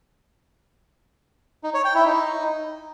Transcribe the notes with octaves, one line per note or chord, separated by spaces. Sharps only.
D#4
C#5
G5
E4
D#4